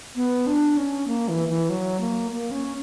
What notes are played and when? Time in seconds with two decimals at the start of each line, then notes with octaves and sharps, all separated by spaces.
0.16 B3
0.47 D4
0.77 C#4
1.08 A#3
1.28 E3
1.49 E3
1.69 F#3
2.00 A#3
2.31 A#3
2.51 C#4